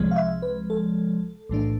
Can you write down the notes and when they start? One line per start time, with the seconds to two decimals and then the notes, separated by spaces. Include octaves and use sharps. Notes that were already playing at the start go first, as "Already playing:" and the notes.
Already playing: C2 C3 F3 G#3
0.11 F5
0.16 E5
0.42 B4
0.70 A4
1.49 B1 A2 E3 A3 D4